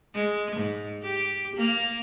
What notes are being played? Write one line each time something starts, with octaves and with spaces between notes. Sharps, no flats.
G#3
G#2
G4
A#3